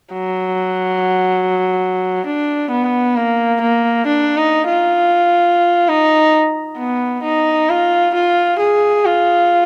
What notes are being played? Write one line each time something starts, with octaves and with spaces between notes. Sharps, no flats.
F#3
D4
B3
A#3
A#3
D4
D#4
F4
D#4
B3
D#4
F4
F4
G#4
F4